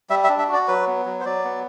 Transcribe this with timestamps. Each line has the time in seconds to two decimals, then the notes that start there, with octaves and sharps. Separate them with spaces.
0.10 G3 E5
0.24 E5
0.29 D4
0.39 E5
0.49 F#4 D5
0.68 F#3 B4
0.87 B3
1.06 F#3
1.20 C5
1.25 F#3 D5
1.44 B3